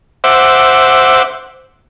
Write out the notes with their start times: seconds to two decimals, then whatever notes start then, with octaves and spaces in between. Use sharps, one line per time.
0.24 C5 E5 F#5 D6